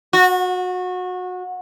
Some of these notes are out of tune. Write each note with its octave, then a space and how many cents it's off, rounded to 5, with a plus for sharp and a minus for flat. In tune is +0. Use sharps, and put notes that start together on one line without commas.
F#4 -25